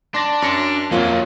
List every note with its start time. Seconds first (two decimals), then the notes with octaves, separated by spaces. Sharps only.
0.14 D4 C6 A#6
0.42 F#2 C6 C#7
0.91 F2 F#3 A#3 F4 C#5